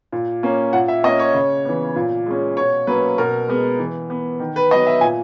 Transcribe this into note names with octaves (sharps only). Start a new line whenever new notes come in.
A#2
A#3 C#4
A#2 F#5
E5
A#3 C#4 D#5
C#5
C#3
E3 B3
A#2
G#3 C#4
B2 C#5
F#3 A#3 C#4 B4
B2 A#4
G#3 B3
E3
B3
D#3
B4
F#3 B3 D#5
E5
A#2 G#5